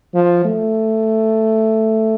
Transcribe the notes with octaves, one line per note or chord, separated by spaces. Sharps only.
F3
A3